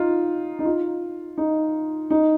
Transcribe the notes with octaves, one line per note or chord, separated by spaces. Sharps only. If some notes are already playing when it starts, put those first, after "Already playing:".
Already playing: D#4 F4
D#4
F4
D#4
D#4